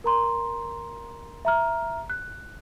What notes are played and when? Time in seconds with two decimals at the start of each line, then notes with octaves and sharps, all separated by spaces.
0.04 A#4 A#5 C6
1.45 E5 A#5 F6
2.10 F#6